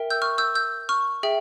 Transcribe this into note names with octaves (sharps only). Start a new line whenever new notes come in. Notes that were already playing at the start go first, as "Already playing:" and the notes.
Already playing: A#4 E5 G5
E6 G6
C#6 F6
E6 G6
E6 G6
C#6 F6
G#4 E5 G5